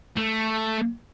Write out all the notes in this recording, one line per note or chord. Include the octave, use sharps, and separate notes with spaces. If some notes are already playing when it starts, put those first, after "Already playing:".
A3